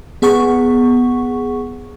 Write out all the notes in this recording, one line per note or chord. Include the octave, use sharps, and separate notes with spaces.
B3 G#4 F#5 C#6